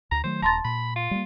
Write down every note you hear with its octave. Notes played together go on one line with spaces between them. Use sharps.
D2 A#5
D#3 F#3 A3 C5
D#1 A5 A#5 C6 A6
A#2 B5
F4
G3 A#3